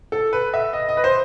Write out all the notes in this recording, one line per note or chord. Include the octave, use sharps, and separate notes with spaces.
A4
B4
E5
D#5
D#5
B4
C5